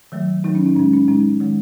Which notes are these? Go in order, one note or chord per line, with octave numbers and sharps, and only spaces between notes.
D#3 F#3 A3
D#3 F#3 A3 D#4
C#4
D#4
A2 G#3 C#4
C#4
A2 G#3 D#4
D#3 G#3